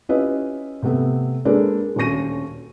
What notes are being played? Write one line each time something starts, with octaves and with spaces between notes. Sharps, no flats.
C#4 E4 F4 G4 B4 D#5
C3 A3 B3
G#3 A#3 D4 A4 B4 D5
D#1 D2 C#4 C#6 A#6 D#7